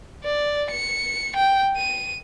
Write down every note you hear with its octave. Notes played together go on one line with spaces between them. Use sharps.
D5
C#7
G5
D#7